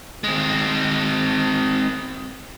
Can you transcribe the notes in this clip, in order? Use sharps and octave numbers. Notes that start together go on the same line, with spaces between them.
G#3 C4